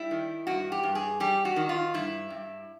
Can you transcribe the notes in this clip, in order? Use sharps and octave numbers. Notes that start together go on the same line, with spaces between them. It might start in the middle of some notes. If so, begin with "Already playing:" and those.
Already playing: G3 E4
D#3
G2 F#4
G4
G2
G#4
G3 G4
F#4
D#3
F4
G2 E4
G2